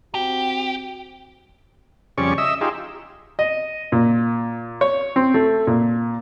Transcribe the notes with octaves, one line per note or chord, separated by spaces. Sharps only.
C4 F#4 G4
F2 C#3 G3 C#4 D5 C#6
D#5 E5 E6
D#4 F4 G4 G#4
D#5
A#2
C#5
C4
A3
A#2